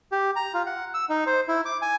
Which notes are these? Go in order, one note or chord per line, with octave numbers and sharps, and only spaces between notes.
G4
A#5
F4
F#5
E6
D#4
C5
E4
D6
G#5